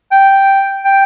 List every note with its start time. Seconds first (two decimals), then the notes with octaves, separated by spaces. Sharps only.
0.12 G5
0.85 G5